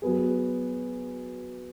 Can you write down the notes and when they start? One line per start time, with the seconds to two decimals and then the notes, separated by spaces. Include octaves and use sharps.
0.02 F#3 B3 G#4